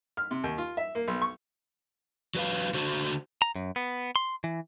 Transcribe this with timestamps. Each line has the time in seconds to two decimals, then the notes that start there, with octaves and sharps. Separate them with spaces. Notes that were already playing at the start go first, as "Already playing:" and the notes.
0.17 F6
0.31 C3
0.44 D#2
0.58 F4
0.77 E5
0.95 A#3
1.08 B1
1.22 C#6
2.35 F#3 B4 F5
2.75 D3 F#4 C5
3.42 A#5
3.55 F#2
3.76 B3
4.16 C6
4.44 E3